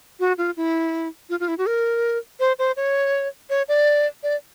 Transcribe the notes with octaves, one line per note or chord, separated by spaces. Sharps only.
F#4
F4
E4
F4
F4
E4
F#4
A#4
C5
C5
C#5
C#5
D5
D5